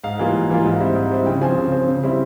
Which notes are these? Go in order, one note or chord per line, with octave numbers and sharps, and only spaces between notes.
G#2 F5
E3 G3 A#3 F4
G#2
E3 G3 A#3 F4
G#2
G3 C4 E4
G#2
G3 C4 E4
C#3 G5
F3 C4 G#5
C#3
F3 C4
C#3
G3 C4 E4